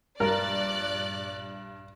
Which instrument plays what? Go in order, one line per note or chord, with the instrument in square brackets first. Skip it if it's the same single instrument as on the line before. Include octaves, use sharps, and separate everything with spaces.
[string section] A#1 D5 F#6 [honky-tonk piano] G2 [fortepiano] A#4